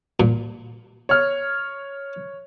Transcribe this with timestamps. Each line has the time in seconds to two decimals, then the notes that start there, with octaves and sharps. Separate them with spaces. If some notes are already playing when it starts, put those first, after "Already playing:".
0.20 A#2
1.09 C#5 F6